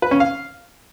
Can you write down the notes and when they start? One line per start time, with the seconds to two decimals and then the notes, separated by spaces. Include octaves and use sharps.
0.02 B4
0.11 C#4
0.20 F5